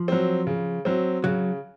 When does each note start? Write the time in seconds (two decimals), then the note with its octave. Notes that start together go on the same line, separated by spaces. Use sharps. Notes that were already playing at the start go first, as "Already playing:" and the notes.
Already playing: F3
0.08 F#3 C4
0.47 C#3
0.85 F#3 C4
1.24 C#3 F#3